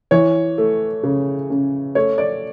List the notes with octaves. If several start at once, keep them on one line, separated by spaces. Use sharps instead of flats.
E3 C#5
A3
C#3
C#3
A3 C#5
D5